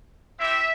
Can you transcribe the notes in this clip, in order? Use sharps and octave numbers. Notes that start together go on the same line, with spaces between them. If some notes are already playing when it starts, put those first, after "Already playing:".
C4 E4 G4 E5